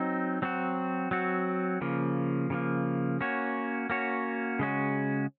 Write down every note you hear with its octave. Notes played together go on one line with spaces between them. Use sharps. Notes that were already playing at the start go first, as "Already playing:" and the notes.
Already playing: F#3 C4 D#4
F#3 C4 F#4
F#3 C4 F#4
C#3 F3 A#3
C#3 F3 A#3
A#3 C#4 F#4 C#5
A#3 C#4 F#4 C#5
C#3 G#3 C#4 F#4